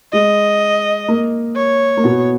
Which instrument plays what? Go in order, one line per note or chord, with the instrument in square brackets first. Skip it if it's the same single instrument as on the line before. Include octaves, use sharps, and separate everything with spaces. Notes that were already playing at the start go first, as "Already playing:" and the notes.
[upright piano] G#3 [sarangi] D#5
[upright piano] A#3
[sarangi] C#5
[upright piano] A#3
B2 B3